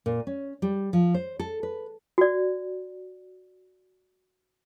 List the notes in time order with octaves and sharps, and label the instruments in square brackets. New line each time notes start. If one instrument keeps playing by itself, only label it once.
[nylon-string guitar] A#2
C#4
G3
F3
C5
A4
B4
[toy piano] F#4 D5